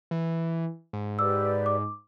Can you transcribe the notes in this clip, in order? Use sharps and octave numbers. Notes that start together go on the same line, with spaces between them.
E3
G#2
G4 B4 D5 D6 E6
D6